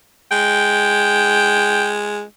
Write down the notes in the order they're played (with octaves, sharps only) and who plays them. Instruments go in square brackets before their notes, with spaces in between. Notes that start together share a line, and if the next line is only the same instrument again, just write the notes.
[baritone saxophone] G#3 [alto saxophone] G5